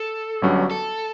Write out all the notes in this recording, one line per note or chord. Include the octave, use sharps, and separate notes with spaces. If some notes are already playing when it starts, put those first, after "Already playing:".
Already playing: A4
G1 G2 F#3 C#4
A4